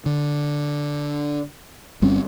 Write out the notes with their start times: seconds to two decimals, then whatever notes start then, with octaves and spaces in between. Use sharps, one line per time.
0.06 D3
2.02 G1 G3 C4 C#4